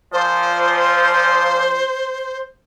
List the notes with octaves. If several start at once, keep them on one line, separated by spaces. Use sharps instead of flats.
A#2 F3 C5